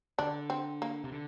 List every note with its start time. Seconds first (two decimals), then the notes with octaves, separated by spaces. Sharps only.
0.19 D3 D4
0.50 C4
0.82 A#3
1.04 C3
1.12 D3